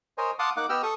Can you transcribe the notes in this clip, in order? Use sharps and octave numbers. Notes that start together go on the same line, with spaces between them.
A#4 C5 C#5 D#5 G#5
F5 F#5 A5 C6 D6 D#6
A#3 D#4 F#5 D6 F#6
B3 G4 D#5 G5 E6 F6
A4 C#6 D#6